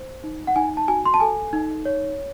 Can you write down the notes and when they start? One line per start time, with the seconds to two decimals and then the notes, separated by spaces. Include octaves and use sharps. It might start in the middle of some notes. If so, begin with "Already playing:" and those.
Already playing: C5
0.24 D#4
0.47 F#5
0.56 D#4 G#5
0.77 A5
0.88 F#4 G#5
1.06 C6
1.14 A5
1.20 A4 G#5
1.53 D#4
1.85 C#5